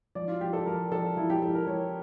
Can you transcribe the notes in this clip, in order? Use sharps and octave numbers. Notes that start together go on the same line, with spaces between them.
F3 D5
F4
F3 G4
A4
F3 A#4
F3 A4
F3 E4
G4
F3 A4
A#4
F3 C#5